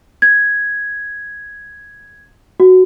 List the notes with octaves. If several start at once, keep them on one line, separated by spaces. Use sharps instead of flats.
G#6
F#4